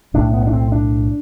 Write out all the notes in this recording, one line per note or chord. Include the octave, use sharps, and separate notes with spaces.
B1 A2 D4
B3
D4
C4
D4